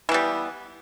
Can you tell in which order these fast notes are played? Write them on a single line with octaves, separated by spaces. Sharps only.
E3 B3 G3